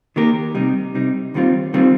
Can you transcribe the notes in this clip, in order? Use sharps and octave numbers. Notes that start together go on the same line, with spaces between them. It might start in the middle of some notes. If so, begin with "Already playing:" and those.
D#3 A#3 G4 A#4
C3 G3 D#4
C3 G3 D#4
D#2 D#3 G3 C4 F4
D#3 G3 C4 F4